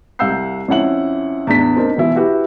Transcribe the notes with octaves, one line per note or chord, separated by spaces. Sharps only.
C2 F5 F#5 E6 G6 C7
F2 C#4 E4 F#5 F#7
E2 A2 D4 B6
C4 D4 D#4 A#4
B2 E3 E4
E4 F#4 G4 B4